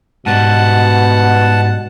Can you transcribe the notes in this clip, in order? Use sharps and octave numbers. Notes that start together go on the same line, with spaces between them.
G#2 B2 G3 F#5 A5